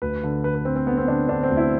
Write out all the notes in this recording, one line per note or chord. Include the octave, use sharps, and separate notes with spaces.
D2 B4
D3
D3 B4
B4
D3 C4
C4
D3 B3
C4
D3 D4
D3 D4
C4
D2
E4